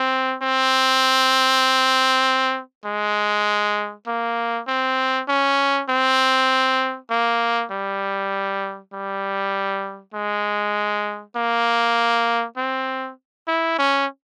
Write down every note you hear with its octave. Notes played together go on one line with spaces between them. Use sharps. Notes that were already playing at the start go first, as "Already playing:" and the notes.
Already playing: C4
C4
G#3
A#3
C4
C#4
C4
A#3
G3
G3
G#3
A#3
C4
E4
C#4